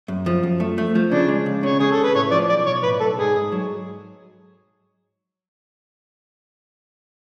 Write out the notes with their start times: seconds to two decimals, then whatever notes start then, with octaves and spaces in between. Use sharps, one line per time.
0.08 F#2
0.26 F3
0.43 F#2
0.60 A3
0.78 A3
0.95 F3
1.11 C#3 D4
1.29 G#3
1.46 C#2
1.63 C#3 C#5
1.80 C#3 G#4
1.91 A4
1.97 C#3
2.04 B4
2.14 A2 C#5
2.32 F3 D5
2.49 B1 D5
2.66 B1 C#5
2.83 A2 B4
3.01 B1 A4
3.18 G#2 G#4
3.36 G#2
3.52 F#3